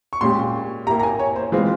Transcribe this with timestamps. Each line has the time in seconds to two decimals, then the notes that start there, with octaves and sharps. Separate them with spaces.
0.13 C#6
0.21 A#2 G#3 C#4 G4 C6
0.86 A#3 E4 G4 A#5
0.99 A#5
1.03 G#5
1.19 C#5
1.36 C5
1.52 E3 G#3 C4 F4 G#4